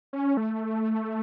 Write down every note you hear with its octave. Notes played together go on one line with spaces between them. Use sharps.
C#4
A3